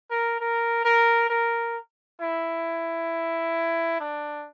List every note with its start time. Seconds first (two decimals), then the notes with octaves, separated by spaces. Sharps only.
0.10 A#4
0.40 A#4
0.85 A#4
1.30 A#4
2.21 E4
4.00 D4